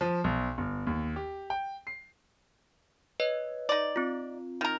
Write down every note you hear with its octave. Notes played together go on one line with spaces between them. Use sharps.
F3
B1
G1
D#2
G4
G5
C7
B4 C#5 D#5
D#4 D5
C4 F4
D#3 A#4